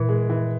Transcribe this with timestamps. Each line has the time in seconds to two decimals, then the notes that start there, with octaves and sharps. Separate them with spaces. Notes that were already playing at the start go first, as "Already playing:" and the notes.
Already playing: A#2 E3
0.09 G#3
0.30 E3